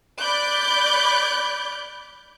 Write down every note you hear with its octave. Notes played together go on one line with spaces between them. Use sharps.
D5 B5 D6 F#6 G6